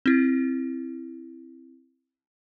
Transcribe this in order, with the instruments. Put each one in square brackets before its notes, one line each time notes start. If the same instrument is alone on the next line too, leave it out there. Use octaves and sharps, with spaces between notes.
[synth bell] C4 E4